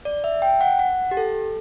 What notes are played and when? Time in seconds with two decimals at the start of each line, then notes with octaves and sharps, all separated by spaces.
0.05 D5
0.24 E5
0.42 G5
0.61 F#5
0.79 F#5
1.11 G4
1.17 A4